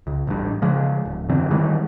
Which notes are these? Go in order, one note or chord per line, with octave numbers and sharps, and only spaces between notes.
C#2
A1 G2
C#3 F3 G#3
D1
F#2 D3 E3 C4
D#3 E3 G3 G#3